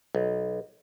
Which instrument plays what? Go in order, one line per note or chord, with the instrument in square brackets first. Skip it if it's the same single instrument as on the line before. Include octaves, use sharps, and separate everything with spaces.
[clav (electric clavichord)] B1